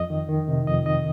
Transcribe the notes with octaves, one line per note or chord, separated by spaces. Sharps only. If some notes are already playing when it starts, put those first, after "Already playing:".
Already playing: F2 D#5
D#3
D#3
C3
F2 D#5
D#3 D#5